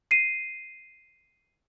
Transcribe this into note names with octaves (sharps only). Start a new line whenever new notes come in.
C7 D#7